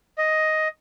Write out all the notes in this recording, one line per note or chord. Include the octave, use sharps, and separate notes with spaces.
D#5